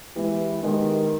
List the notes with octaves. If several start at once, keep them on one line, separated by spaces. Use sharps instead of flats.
E3 G#3 B3 G4
D#3 G#3 B3 G4